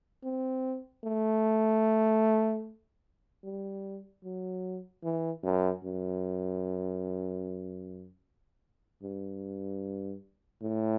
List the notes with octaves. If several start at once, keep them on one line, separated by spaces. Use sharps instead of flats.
C4
A3
G3
F#3
E3
F#2
F#2
G2
A2